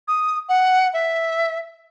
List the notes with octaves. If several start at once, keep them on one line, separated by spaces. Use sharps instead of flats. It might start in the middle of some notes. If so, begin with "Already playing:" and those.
D#6
F#5
E5